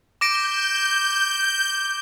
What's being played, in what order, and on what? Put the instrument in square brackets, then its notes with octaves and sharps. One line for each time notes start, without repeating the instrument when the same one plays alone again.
[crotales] D6 A#6 D7 [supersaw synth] G6